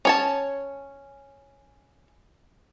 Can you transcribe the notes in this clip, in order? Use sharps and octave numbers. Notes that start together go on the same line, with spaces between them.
C#4 C#5 A5